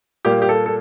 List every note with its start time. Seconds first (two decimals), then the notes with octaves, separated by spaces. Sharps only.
0.25 A#2 G3 A#3 G4
0.42 G4
0.49 A4
0.66 A4